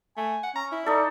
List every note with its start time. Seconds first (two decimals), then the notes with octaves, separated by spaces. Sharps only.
0.17 A3 G#5
0.43 F#5
0.56 C#4 A#5
0.72 E4
0.86 D#4 A4 D5